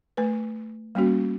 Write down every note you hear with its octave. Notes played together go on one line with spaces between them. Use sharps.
A3 B4
G3 A#3 C#4 F#4